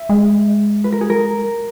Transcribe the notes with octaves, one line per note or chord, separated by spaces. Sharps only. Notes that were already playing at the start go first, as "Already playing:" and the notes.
Already playing: E5
G#3
B4
A#4
G#4
A#4